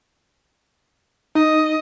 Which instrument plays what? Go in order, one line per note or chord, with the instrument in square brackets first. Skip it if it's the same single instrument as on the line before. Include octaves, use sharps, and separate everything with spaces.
[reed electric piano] D#4 [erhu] D#5